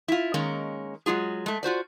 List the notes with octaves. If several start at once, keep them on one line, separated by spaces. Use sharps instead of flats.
E4 F4
D#3 G#3 A#3 C#4
F#3 G#3 F4 G#4
G#3 A3
F4 F#4 C5 D5